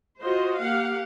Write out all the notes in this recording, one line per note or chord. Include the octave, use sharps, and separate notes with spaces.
F4 F#4 C5 D#5
A#3 G4 F5 F#5